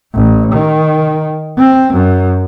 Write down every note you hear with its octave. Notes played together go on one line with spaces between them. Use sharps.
A1
D#3
C4
F#2